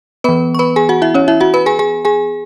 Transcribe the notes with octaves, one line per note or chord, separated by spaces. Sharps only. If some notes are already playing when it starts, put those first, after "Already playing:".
E3 B3 B4 B5
C#6
B4 B5
G#4 G#5
F#4 F#5
E4 E5
C#4 C#5
E4 E5
F#4 F#5
B4 B5
G#4 G#5
G#4 G#5
G#4 G#5